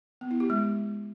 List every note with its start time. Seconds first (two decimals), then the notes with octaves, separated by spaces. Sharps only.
0.21 B3
0.31 E4
0.40 G4
0.50 G#3